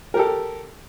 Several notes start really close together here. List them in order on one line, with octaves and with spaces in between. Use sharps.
A#4 G4 A4